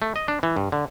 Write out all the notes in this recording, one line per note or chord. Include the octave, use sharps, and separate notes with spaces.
A3
D#5
D4
E3
G2
D3